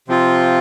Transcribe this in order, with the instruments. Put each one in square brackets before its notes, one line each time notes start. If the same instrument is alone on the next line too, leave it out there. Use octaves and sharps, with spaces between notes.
[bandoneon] C3 F3 C4 F4